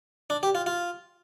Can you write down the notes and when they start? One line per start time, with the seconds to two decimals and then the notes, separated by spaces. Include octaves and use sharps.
0.30 D4
0.43 G4
0.55 F4
0.66 F4